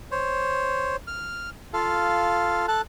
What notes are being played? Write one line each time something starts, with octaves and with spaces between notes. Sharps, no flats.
C5 C#5
F6
F4 A4 F5
A4 A5 F#6